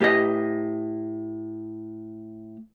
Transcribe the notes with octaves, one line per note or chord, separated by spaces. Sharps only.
A2 G4 B4 D#5